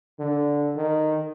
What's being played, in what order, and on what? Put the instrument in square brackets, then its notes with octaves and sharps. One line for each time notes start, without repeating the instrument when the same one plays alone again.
[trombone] D3
D#3